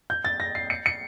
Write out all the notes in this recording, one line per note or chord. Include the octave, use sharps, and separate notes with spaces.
G6
A6
A#6
C7
C#7
C#7